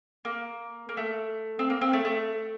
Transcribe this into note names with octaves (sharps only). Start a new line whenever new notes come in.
A#3
A#3
A3
C4
A#3
C4
A3
A3